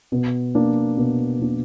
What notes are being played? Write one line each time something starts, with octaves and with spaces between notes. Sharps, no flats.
B2
A#3 D4
B2
A#3 D4